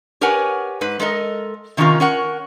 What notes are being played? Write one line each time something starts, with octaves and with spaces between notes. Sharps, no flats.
G4 A#4 B4 C#5 F#5 G#5
G#2 B4
G#3 A4 A#4 D#5
C3 D#3 C#4 D#4 F4 A#4
C#4 A#4 F#5